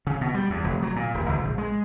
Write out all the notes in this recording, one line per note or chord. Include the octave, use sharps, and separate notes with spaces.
C#3
B2
G3
E2
F1
F#3
A#2
D#1
C#2
A#1
G#3